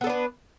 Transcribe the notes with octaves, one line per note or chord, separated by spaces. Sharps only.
B3 D4 A4 B4